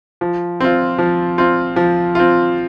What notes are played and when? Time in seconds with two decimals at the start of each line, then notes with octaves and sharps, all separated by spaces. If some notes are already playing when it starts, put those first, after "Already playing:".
0.21 F3
0.60 C4 F4
0.99 F3
1.38 C4 F4
1.76 F3
2.15 C4 F4